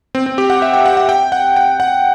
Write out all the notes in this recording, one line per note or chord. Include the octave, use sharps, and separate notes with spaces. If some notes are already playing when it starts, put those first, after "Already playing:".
C4
C4
G4
F#5
E5
G5
F#5
F#5
G5
F#5
G5
F#5